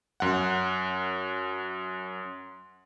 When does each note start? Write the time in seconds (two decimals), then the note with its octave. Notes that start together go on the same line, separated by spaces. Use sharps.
0.20 F#2 F#5